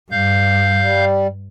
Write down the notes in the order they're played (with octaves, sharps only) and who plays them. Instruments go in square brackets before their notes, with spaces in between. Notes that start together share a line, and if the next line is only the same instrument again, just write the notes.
[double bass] G2 [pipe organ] F5 G6
[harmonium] G3